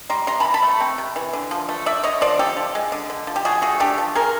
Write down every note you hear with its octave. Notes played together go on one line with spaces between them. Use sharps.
G3 A#5 C6
C3 A#5 C6
E3 A5 B5
A5 B5
A3
C4
C3
E3
D3
F3
A3
D3 D5 E5
D3 C#5 D#5
F3 C5 D5
D3 G4 A4
F3
G#3
D3
D3
F3
G4
F3 F#4 G#4
A3 F#4 G#4
D4 G4 A4
F3
F3 G#4 A#4